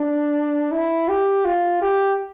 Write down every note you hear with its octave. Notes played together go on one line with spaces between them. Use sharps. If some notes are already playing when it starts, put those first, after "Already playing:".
Already playing: D4
E4
G4
F4
G4